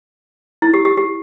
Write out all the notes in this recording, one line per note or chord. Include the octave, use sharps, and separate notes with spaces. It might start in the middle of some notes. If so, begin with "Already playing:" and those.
E4
G4
G4
G4